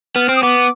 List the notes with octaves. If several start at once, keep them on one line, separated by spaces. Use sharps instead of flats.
B3 F6
C4
D#6
B3 D6